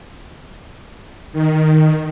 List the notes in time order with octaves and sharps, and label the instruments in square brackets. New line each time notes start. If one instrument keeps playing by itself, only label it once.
[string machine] D#3